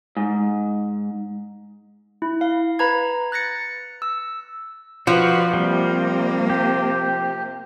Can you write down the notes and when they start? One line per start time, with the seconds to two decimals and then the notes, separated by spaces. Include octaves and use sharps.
0.17 G#2
2.22 E4
2.41 F5
2.79 B4 A#5 B5 G#6
3.32 F#6 A6 A#6 C#7
4.02 E6
5.07 F3 F#4 B4 D5
5.53 C3 G3 A#3
6.50 G4